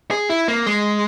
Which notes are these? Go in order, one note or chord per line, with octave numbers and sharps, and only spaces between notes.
G#4
E4
A#3
G#3